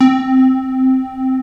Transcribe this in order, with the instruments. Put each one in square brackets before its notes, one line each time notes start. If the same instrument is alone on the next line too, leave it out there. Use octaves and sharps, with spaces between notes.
[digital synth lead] C4